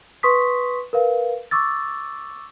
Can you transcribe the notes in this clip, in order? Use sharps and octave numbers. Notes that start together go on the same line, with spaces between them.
B4 C6 C#6 D#6 B6
A#4 B4 F5
C#6 D6 E6 A6